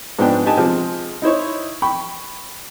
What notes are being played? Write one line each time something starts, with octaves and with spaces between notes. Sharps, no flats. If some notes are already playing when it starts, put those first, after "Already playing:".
G#2 F3 B3 D4 G5
B3 D#4 G4 G#5 A5
C3 F3 G#3
D#4 E4 C5 C#5
G5 B5 C#6